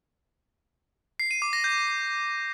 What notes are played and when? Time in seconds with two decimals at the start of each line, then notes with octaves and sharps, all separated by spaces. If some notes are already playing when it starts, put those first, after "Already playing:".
1.20 C7
1.31 D#7
1.42 D6
1.53 A#6
1.64 G6